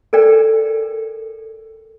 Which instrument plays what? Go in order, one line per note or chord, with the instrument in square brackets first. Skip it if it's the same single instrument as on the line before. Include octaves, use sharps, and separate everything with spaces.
[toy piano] A4 A#4 D5 G5